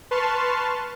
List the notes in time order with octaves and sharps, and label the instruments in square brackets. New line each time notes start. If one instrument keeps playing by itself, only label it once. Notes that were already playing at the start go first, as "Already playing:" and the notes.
[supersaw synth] B4 A5 C6 C#6 F6